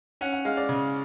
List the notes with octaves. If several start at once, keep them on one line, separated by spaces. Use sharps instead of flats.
C#4 F#5
F#5
G#3 F5
D5
C#3